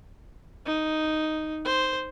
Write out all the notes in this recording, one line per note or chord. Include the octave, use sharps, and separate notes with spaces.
D#4
C5